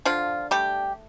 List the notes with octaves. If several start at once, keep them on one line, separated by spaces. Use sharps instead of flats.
D3 F3 F4
G3 A3 G4